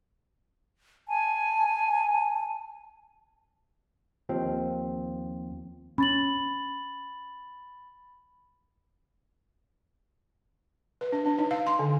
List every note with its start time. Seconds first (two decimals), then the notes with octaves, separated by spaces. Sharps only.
1.08 G#5 A5
4.29 D#2 F3 C4
5.98 C#4 B5 A6 F#7
11.01 B4
11.12 D4
11.26 D4
11.38 D#4
11.51 F5
11.67 C6
11.79 D3